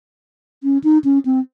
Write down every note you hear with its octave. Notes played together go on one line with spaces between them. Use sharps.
C#4
D#4
C#4
C4